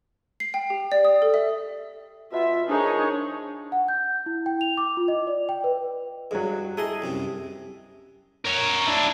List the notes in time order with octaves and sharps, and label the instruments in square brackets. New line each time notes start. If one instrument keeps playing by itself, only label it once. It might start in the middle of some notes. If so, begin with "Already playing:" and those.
[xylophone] C7
G5
G4
D5
D#6
A4
E5
[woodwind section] B2 F4 [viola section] E5
[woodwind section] F3 A#3 D4 [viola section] D#4 G#4 C#5
[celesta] F#5
G6
E4
G5
F7
D6
F4
D#5
D5
G5
B4
[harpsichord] G2 [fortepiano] F#3 G#3
[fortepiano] E4 G#4 A4 [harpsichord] D#5 C6 D#6
[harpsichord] C2 F#2 C3
[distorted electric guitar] A#4 C#5
D4 E4